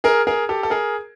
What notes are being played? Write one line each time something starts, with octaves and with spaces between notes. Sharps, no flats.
G#4 A#4
G#4 A#4
G4 A4
A4
G#4 A#4